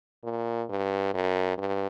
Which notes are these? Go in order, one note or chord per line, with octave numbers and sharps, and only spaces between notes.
A#2
G2
F#2
G2